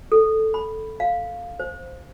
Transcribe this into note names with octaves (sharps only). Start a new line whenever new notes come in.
A4
B5
F5
C5